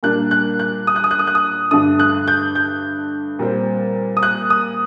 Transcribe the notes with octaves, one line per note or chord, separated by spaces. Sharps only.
A#2 G3 A#3 D4 F#6
F#6
F#6
D#6
F#6
D#6
F#6
D#6
F#6
D#6
G2 D3 A3 D4 D#6
F#6
G6
G6
A#2 G3 C4
D#6
F#6
D#6